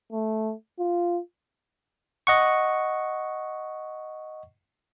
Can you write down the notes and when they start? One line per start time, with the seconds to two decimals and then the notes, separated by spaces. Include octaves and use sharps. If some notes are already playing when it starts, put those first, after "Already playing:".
0.12 A3
0.79 F4
2.27 D#5 F#5 C#6